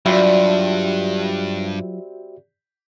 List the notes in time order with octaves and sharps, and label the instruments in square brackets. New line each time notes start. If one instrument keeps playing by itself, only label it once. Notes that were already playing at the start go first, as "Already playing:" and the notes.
[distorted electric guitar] G2 [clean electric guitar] F#3 F4 B5 [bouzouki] G3 C4 [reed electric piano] F#4 E5